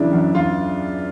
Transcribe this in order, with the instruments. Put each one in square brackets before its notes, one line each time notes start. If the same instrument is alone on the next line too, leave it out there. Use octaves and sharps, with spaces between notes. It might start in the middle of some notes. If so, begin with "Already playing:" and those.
Already playing: [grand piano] F#2 C#3 E3 D4 E4
F#2
F#2 F4